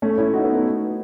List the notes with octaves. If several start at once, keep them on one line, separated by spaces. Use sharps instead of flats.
A3 C#4
C#4 E4
D#4 F#4
B3 D#4
B3 D#4